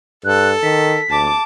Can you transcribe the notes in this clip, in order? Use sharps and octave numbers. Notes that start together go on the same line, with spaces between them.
G2 A4 F#6
D#3 B6
D2 A5 D6